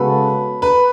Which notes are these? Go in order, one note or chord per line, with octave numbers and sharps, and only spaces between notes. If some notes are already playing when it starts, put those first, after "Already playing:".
Already playing: C#3 G#3 B3 F#4 A4 B4
B4